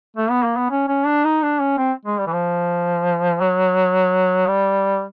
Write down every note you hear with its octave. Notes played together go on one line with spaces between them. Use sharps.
A3
B3
A#3
B3
C#4
C#4
D4
D#4
D4
C#4
C4
G#3
G3
E3
F3
F#3
G3